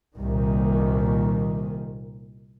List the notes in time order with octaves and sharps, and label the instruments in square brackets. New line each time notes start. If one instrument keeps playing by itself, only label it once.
[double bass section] C2 A#2 D#3